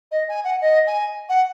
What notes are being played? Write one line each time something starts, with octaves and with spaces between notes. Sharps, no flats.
D#5
G#5
F#5
D#5
G#5
F#5